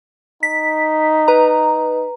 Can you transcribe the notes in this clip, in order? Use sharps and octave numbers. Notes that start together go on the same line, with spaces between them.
D#4 B6
B4 A#5